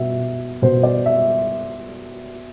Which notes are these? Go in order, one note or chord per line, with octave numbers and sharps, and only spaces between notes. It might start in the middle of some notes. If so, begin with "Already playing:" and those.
Already playing: B2 E5
B2 C5
D5
E5